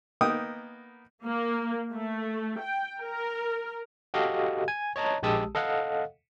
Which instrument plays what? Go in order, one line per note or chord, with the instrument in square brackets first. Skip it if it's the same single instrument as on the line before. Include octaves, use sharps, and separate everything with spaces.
[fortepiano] A#3 B3 D#4 G5 D#6
[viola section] A#3
A3
G5
A#4
[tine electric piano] F#4 G4 A4 D#5 F5
G#5
C#5 D#5 A5 A#5
A#1 G#3 G4 A5 D#6 E6
A4 D#5 F5 F#5